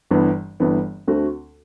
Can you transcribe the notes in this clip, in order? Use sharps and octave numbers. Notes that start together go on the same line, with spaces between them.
G1 G2 E3 B3
G1 G2 E3 B3
D2 D3 A3 C4 F#4